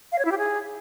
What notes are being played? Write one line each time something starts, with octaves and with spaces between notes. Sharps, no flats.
F5
C#5
E4
G4
G#4